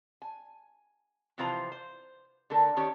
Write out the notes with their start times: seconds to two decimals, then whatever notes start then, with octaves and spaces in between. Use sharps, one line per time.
0.22 G#5
1.38 C3 E3 F3 F4 C5 A#5
1.72 C5
2.50 D3 A3 A4 A#4
2.77 D#3 C#4 G4 C#5